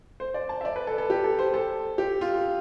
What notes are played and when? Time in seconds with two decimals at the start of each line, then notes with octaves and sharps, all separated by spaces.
0.20 C5
0.34 D5
0.49 A5
0.61 E5
0.65 D5
0.76 B4
0.87 A4
0.98 A4
1.10 G4
1.24 A4
1.39 C5
1.54 A4
1.98 G4
2.21 F4